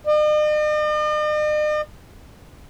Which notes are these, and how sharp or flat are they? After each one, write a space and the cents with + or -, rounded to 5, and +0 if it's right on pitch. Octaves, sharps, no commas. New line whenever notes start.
D#5 -45